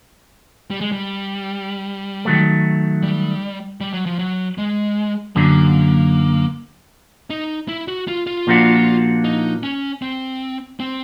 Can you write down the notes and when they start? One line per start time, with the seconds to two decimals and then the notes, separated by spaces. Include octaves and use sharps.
0.71 G3
0.81 G#3
0.92 G3
2.25 D#3 F#3 A3
3.03 G3
3.81 G3
3.93 F#3
4.06 F3
4.19 F#3
4.58 G#3
5.36 F#2 D3 F#3 A#3
7.30 D#4
7.68 E4
7.88 F#4
8.08 F4
8.27 F4
8.47 A#2 F3 A#3 D4 F#4
9.24 D#4
9.63 C#4
10.02 C4
10.80 C4